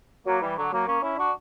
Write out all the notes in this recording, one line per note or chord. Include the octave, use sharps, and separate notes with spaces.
F#3 A#3
E3 G3
D3 F#3
F#3 A#3
A#3 C#4
C#4 E4
D4 F#4